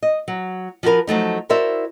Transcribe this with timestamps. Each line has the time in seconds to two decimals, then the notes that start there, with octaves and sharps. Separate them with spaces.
0.03 D#5
0.28 F#3
0.83 F3 F#4 G4 A#4 B4
1.07 F3 F#3 A3 D#4
1.49 E4 F#4 A#4 C5 D5 E5